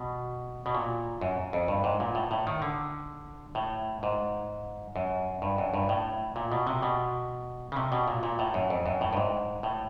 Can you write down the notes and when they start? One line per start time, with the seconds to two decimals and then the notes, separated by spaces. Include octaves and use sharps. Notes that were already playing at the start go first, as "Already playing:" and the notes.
Already playing: B2
0.66 B2
0.75 A#2
1.21 F#2
1.53 F2
1.68 G2
1.84 G#2
2.00 A#2
2.15 A2
2.31 A2
2.47 D#3
2.62 D3
3.55 A2
4.03 G#2
4.96 F#2
5.42 G2
5.58 F#2
5.74 G2
5.89 A2
6.36 A#2
6.52 B2
6.67 C3
6.82 B2
7.72 C#3
7.76 C3
7.92 B2
8.08 A#2
8.23 A#2
8.39 A2
8.54 F#2
8.70 F2
8.86 F#2
9.01 A2
9.13 G2
9.17 G#2
9.63 A2